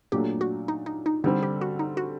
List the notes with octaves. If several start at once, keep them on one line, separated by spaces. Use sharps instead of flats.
A#2 F#3 A3 D4 G4
F#4
D#4
D#4
D#4
D3 G3 C4 D#4
G4
F#4
D#4
F#4